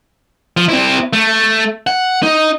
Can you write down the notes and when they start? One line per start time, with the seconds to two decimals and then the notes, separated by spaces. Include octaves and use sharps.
0.57 F3
0.69 C4 E4
1.13 A3
1.87 F#5
2.23 D#4